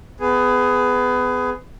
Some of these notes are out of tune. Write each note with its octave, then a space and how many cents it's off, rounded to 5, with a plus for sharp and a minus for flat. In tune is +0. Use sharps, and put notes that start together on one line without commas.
B3 +25 G#4 +5